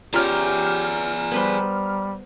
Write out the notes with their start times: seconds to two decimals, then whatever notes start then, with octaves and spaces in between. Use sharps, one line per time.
0.14 C#4 F4 G4 G#4 D5 A#5 F6
1.32 G3 B3 B4 C5